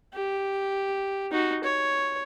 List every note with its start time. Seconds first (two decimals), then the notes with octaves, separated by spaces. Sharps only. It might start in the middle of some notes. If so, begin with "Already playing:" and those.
0.13 G4
1.31 D#4 F#4
1.63 C#5